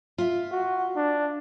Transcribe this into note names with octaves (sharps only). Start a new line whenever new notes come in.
F4 E5
F#4
D4